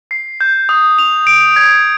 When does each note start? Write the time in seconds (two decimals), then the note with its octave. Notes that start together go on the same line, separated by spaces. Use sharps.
0.11 C7
0.41 G6
0.69 D#6
0.99 F7
1.27 D7
1.56 G#6